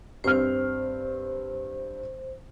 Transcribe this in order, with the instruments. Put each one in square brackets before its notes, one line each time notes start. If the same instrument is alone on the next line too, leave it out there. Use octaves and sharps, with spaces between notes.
[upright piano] G2 C4 F6 [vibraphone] C5